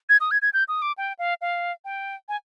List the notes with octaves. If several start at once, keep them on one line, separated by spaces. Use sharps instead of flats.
G#6
D#6
G#6
G#6
G6
D#6
D6
G5
F5
F5
G5
G#5